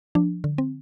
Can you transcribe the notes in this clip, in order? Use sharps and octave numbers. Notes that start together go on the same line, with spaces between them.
F3 D4
D3
C4